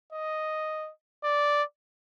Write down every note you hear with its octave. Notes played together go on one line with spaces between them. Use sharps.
D#5
D5